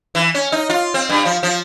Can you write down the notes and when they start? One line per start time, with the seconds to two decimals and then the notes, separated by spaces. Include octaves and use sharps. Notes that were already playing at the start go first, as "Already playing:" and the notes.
0.15 E3
0.35 C#4
0.52 D#4
0.70 F4
0.94 C4
1.09 G2
1.25 F3
1.43 F3